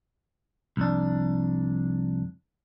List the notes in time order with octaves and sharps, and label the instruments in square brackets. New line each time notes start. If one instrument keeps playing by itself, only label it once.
[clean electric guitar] C2 F2 D4